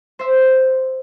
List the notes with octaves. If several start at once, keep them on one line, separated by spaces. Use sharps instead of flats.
C5 E5